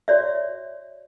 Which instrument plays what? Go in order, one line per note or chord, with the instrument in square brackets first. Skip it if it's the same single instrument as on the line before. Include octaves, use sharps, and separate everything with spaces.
[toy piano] F#4 C#5 D5 E5